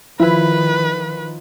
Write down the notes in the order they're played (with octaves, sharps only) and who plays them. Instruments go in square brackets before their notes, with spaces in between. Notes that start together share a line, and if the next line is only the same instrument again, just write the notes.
[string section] D#3 [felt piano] F3 [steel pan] E4 [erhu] B4